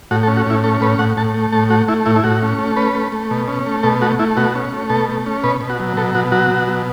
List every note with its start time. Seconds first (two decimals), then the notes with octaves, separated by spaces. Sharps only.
0.11 A2 F#4
0.23 A4
0.28 C#4
0.36 F#4
0.47 A2 E4
0.64 C#4 A4
0.81 A2 B4
0.99 A2 F#5
1.17 A2 A5
1.34 A3
1.53 A2 A5
1.70 A3 F#4
1.88 A3 E4
2.06 A2 E4
2.16 E4
2.24 A2 F#4
2.42 C#4
2.59 A3
2.76 C#4 B4
2.95 A3
3.12 A3
3.31 B2
3.48 C#4
3.66 A3
3.83 B2 A4
4.02 A3 F#4
4.19 A3 E4
4.37 B2 F#4
4.55 C#4
4.73 A3
4.90 B2 A4
5.09 A3
5.26 C#4
5.43 B2 B4
5.61 B2
5.70 F#4
5.80 F#3
5.97 B2 A4
6.15 B2 F#4
6.32 F#3 F#4
6.51 B2
6.67 F#3